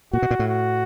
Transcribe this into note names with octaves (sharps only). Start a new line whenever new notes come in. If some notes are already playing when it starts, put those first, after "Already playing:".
A#2 F#4
B2
A#2
A2
F#4